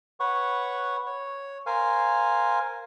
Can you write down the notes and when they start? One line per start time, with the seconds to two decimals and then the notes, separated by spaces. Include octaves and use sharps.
0.20 B4 C#5 F#5 C#6
1.06 C#5
1.66 A#4 C5 F5 G#5